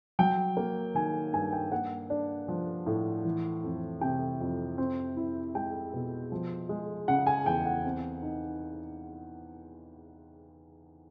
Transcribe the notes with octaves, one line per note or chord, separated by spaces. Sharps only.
F#3 G5
A#3
D#3 G#5
G2 G#5
G5
A#3 F#5
D4
F3
A2
E3
F2
C3 G5
F2
C4
E4
G#3 G5
B2
F3
G#3
C#3 F#5
G#5
E2 G5
F#5
C4
D#4